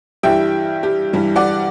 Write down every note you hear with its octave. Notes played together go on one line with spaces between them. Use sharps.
G2 E3 G3 E5 G5
G4
G2 E3 G3
D5 F#5